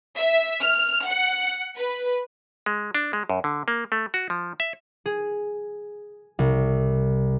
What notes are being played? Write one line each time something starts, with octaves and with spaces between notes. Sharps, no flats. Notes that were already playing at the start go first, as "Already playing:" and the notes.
E5
F6
F#5
B4
G#3
D4
G#3
F#2
D3
A#3
A3
F#4
F3
E5
G#4
C2